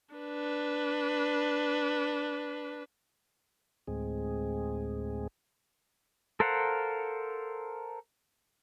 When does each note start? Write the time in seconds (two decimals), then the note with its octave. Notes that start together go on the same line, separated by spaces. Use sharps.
0.14 D4 B4
3.87 D2 A2 G#3 C4 G#4
6.40 A4 A#4 C5 F5 F#5